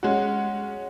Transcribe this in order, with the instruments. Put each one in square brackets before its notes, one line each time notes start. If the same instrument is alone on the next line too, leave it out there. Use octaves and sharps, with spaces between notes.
[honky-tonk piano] G#3 C#4 F#4